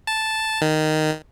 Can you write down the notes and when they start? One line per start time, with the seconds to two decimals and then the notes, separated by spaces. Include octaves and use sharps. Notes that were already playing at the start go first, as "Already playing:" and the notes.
0.07 A5
0.61 D#3